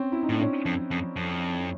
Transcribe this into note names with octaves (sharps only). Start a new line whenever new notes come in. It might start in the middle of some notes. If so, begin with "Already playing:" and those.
Already playing: C4 C#4
E4
D#4
A2 D4
C#4
F2
F2
F2